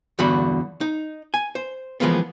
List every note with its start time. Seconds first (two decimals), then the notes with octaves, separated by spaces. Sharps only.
0.19 E2 G2 D3 F#4 B5
0.81 D#4
1.34 G#5
1.55 C5
2.00 E3 F3 G#3 A#3 B3